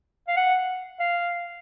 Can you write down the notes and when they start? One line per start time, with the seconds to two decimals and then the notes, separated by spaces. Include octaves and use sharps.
0.28 F5
0.36 F#5
1.00 F5